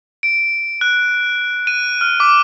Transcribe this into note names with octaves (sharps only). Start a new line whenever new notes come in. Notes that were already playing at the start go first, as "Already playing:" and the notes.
D7
F#6
D#7
F6
D6